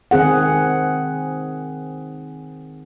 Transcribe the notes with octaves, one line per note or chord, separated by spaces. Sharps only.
D#3 C4 G#4 F#5